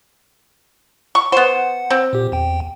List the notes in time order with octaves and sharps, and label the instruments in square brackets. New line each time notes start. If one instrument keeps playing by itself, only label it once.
[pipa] C#6
[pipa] B3 C5 [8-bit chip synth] F#5
[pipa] C4
[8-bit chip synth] A#2 G4
E2 G5